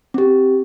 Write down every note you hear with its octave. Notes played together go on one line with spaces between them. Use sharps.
C4 G4